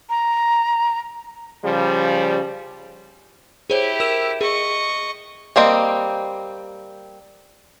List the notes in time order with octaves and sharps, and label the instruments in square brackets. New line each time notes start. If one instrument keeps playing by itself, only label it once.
[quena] A#5
[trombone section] C#3 F3 G3
[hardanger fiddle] E4 G4 [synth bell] G#4 C5 C#5
[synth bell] A#4 E6 E7
[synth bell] G#4 [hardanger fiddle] D#5 C#6
[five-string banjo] G3 A#3 C4 D#5